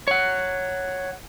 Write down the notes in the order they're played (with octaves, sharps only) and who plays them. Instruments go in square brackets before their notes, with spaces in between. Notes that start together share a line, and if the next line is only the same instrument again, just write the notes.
[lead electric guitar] C#5 F#5